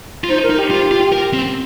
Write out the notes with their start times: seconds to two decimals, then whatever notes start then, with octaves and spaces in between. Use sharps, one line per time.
0.24 F4
0.29 D#4 C5
0.43 A#4
0.50 D#4
0.57 G4
0.71 F4
0.91 F4
1.12 A#4
1.34 C4